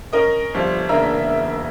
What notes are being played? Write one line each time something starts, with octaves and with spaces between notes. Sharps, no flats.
C#4 A#4 D#5
G1 F3 G3 F4
E1 C#3 A#3 D4 E5 A#5